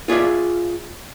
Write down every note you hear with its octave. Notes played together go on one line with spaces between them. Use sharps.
F4 G#4 D5 E5